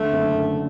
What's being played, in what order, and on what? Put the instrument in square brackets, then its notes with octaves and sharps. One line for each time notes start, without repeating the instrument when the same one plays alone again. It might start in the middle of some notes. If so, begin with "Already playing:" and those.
Already playing: [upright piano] D3 [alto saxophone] A3
[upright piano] F#1
F#2